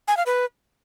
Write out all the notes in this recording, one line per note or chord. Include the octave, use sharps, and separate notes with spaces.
G#5
F5
B4